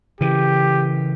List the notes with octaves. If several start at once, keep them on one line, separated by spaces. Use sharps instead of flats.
C#3 E3 G4